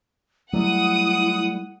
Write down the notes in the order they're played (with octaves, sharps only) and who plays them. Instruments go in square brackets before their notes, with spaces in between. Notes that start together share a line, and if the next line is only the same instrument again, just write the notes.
[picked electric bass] F#3 G3 A3 [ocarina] E4 [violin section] F#5 D#6